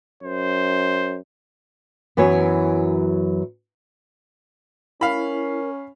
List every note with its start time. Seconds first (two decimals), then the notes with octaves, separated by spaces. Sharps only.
0.23 F#2 C5
2.17 F#2 E3 F#3 B3 C#5
5.01 C#4 E4 A#4 F5 B5